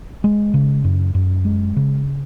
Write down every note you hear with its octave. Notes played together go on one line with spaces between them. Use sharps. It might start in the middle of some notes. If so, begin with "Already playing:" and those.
G#3
C#3
F#2
F#2
G#3
C#3